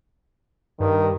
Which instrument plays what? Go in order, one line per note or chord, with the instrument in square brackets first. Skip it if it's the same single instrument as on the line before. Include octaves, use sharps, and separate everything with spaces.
[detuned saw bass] G2 [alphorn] D#3